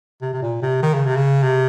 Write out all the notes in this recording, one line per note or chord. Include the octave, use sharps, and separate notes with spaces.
C3
C3
A#2
C3
D#3
C#3
C3
C#3
C3